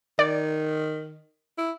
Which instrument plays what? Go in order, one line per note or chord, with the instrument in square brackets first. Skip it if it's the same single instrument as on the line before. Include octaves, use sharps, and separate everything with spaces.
[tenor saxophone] D#3 [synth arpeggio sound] D5
[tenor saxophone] E4